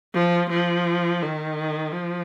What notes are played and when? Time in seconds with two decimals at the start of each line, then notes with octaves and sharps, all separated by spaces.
0.14 F3
0.50 F3
1.22 D#3
1.92 F3